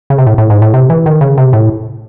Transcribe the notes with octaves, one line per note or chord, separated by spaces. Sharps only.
C#3
C3
A2
A2
G#2
A2
C3
E3
D#3
C#3
C3
A2